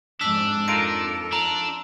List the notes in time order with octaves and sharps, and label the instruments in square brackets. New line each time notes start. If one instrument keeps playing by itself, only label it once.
[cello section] F2 G#2 [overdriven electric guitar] D4 [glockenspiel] E6 B6
[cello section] F2 A4 [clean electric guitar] D#4 F4 A#4 [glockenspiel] D7
[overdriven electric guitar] D4 [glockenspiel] A#5